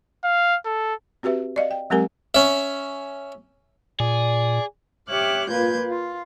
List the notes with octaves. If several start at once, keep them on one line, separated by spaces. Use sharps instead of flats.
F5
A4
C4 F#4 G4 B4 E5
D5 D#5 F5
G5
F#3 G#3 C4 G4 A#4 G#5
C#4 E5
A#2 G#4 D5
G4 C#5 E5 D6 F6 F#6
A#2 A#3 F4 B4 G6 G#6
F4